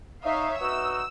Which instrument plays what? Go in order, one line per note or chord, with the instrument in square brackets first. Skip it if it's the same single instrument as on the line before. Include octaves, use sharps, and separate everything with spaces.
[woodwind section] D#4 [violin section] C#5 E5 F5
[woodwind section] B3 D#4 F#4 [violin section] E6